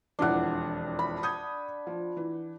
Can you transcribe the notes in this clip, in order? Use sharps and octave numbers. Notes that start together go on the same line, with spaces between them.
E1 F2 E3 D4 F#5
B5
D#6 G6 G#6
F3
E3